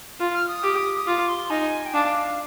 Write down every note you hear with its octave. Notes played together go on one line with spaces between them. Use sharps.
F4
F6
D#6
G4
D#6
F4 D6
C6
D#4 G#5
G5
D4 F5